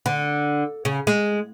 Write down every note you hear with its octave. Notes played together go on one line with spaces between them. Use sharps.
D3
C#3
G#3